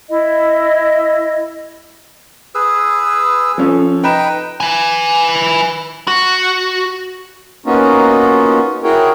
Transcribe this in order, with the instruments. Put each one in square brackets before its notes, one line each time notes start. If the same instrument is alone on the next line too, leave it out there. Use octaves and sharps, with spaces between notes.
[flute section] E4 D#5
[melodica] G#4 B4 E6
[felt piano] F3 C#4 A4
[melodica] D#4 B4 G5 [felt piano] A#5 B5 E7
[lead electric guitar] B4 G#5
F#4
[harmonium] A#3 B3 C#4 D#4 F4 F#4
E4 F#4 G#4 A#4 C#5 G5